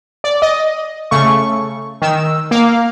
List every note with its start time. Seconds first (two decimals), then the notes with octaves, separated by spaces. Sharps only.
0.24 D5
0.42 D#5
1.11 C#3 A3 C#6
2.02 D#3 E6
2.51 A#3 F5